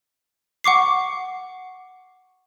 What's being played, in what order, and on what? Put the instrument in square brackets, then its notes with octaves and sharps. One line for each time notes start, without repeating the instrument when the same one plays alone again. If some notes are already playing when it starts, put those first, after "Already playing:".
[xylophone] F#5 C#6 D6 C7